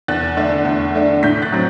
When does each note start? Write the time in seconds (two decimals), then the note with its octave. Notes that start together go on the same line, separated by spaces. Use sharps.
0.08 E2 F#6 A6
0.37 D3 A3 D4
0.65 E2
0.95 D3 A3 D4
1.23 A2 G6 B6
1.42 F#6 A6
1.52 F#3 C4